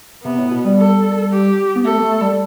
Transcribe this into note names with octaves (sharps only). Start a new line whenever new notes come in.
C3 B3
A2
B2
G3
A4
G4
B3
A3 A4
B3
A3
G3